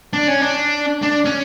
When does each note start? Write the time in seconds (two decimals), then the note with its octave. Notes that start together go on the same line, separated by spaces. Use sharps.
0.13 D4
0.28 C#4
0.41 D4
1.03 D4
1.26 C#4